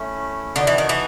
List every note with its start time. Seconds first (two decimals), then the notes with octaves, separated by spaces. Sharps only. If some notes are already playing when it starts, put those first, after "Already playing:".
Already playing: A3 C#4 E4
0.56 D3 B3 D#4 F#4 A4
0.67 E3
0.78 D#3
0.89 E3